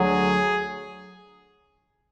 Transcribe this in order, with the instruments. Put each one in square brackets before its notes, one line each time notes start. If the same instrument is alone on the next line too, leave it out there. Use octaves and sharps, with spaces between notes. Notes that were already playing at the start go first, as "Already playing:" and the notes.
Already playing: [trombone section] D2 D3 F#3 [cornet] G#4